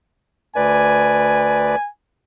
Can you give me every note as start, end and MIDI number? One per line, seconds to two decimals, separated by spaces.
0.56 1.76 38
0.56 1.76 71
0.56 1.76 74
0.56 1.89 80